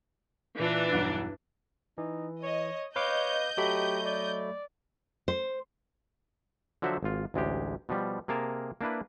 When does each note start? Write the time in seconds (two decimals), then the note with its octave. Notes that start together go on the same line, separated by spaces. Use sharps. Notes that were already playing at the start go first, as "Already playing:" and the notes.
0.59 A#2 E3 D4
0.93 B1 E2 G2
1.98 E3 D#4
2.43 C#5 D#5
2.96 B4 C#5 D#5 F5 D6 G6
3.57 F#3 A3 G4 B5
4.06 D5
5.28 C5
6.82 D3 F3 F#3 F#4 C5 E5
7.03 G#1 F4
7.34 A1 D2 G#3 G4
7.89 B2 F3 G3
8.28 C3 A#3 G#4 A#4 A5
8.81 A#3 D4 E4 B4